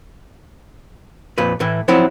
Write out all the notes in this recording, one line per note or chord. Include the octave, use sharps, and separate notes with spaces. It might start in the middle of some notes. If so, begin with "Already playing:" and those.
F2 A#2 B4
A2 E3 E4
F3 F#3 C4 E4